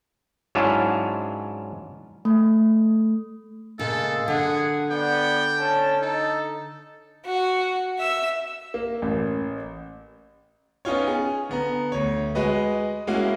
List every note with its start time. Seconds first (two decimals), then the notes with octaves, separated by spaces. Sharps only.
0.55 G#2 F#3 C#4 D4 E4 F4
2.25 A3
3.79 A#2 C#3 G#3 A3 A4 F5
4.28 D3 G#4 F#5
4.91 B3 D5 G5
5.59 C#4 A5
6.02 D#4 A4
7.26 F#4
7.99 E5 E6
8.74 A#3
9.02 A1
10.85 B3 C#4 D#4 F4 C#5
11.07 G#4
11.49 D3 B3 A#5
11.92 D2 C#5
12.35 G#3 F#4 B4 D#5
13.07 G#3 A#3 C#4 E4 F#4